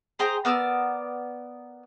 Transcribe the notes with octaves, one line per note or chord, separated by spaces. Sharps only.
G#4 C5 G5 A#5
B3 A#4 D5 E6